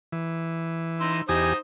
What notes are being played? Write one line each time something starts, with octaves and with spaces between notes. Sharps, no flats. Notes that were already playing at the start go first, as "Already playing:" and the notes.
E3
D#4 C6 E6
E2 D#4 G4 C5 G#5 D#6